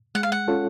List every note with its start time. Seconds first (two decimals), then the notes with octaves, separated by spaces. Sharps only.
0.15 G#3 F#5
0.23 F5
0.32 F#5
0.48 C#4 F4 A4 C#5